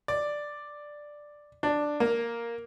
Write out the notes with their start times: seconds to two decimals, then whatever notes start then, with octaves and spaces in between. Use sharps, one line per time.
0.08 D5
1.63 D4
2.00 A#3